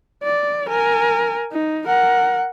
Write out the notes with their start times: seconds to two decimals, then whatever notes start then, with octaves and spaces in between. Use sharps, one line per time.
0.23 D5
0.69 A#4 G#5
1.52 D#4
1.87 A#4 F#5